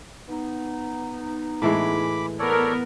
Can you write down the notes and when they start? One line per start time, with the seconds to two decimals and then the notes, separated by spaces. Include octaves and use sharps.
0.29 B3 D#4
1.62 A2 E3 G#3 B5 D6
2.39 B3 A4 A#4 C#5 D5